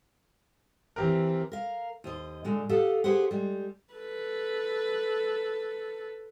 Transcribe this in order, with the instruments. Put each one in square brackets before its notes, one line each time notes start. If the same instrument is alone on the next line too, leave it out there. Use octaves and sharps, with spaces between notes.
[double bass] E3 [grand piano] C4 G4 A#4
[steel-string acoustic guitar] A#4 F5
D#2 C5 D#5
A#2 D3 G#3
G4 A4 D#5 F5 F#5
G4 G#4 B4 C5 F#5
G3 G#3
[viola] A4 B4